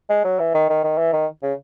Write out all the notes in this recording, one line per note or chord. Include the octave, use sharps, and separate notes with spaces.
G#3
F#3
E3
D#3
D#3
D#3
E3
D#3
C#3